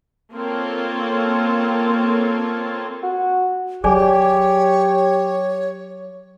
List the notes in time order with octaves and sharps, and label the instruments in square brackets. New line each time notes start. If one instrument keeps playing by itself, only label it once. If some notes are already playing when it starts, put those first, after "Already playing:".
[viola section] A#3 C4 F4 A4 C#5
[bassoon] F#4
[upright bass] F#3 [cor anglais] G4 [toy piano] G#4 D5 G#5 [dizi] C#5